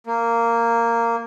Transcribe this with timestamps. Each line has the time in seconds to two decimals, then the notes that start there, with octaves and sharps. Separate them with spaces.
0.07 A#3